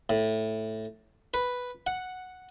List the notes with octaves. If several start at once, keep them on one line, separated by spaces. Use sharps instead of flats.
A2
B4
F#5